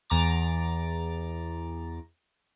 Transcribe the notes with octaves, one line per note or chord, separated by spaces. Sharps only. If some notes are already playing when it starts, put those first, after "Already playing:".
E2 A#5 D6 A6